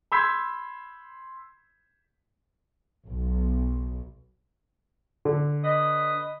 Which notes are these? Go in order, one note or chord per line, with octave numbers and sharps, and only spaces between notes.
B5 C6 E6 G6 G#6 B6
B1
D3
B4 D#5